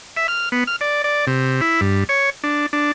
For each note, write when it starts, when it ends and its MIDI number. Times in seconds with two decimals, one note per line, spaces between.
0.17 0.27 76
0.28 0.49 89
0.52 0.64 59
0.67 0.76 89
0.81 1.02 74
1.04 1.25 74
1.27 1.61 48
1.61 1.81 64
1.81 2.04 43
2.09 2.30 73
2.44 2.66 62
2.73 2.92 62